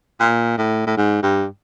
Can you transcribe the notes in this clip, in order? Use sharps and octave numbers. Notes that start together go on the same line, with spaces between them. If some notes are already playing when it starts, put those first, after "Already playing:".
A#2
A2
A2
G#2
G2